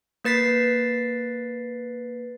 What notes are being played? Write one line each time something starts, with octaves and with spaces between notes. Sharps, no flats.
A#3 B4 A6 B6 C7